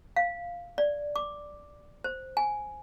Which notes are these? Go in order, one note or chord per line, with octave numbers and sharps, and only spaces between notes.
F5
D5
D6
C5
G#5